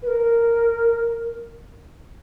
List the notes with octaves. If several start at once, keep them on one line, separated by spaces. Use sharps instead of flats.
B4
A#4